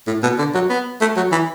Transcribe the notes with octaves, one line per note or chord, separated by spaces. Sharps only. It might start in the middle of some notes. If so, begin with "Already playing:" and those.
A2
B2
D3
F#3
B3
A3
F#3
E3